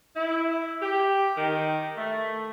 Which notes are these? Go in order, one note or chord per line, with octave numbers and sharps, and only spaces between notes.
E4
G4
D#3
A3